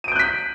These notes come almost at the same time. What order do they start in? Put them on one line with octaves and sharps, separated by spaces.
D#7 D7 G6 F#6 B6